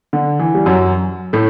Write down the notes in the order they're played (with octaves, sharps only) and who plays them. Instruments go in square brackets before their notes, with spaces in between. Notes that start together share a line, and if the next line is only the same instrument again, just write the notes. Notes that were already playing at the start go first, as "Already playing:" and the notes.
[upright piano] D3
E3
G3
F#2 F#3
A2 A3